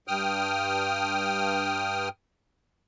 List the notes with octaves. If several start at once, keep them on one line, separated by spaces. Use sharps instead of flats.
G2 G5 D#6 F6